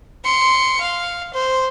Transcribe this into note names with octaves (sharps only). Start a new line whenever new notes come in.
C6 C#7
F5
C5